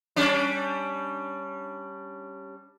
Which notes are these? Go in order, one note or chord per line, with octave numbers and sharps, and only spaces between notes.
G3 C#4 D4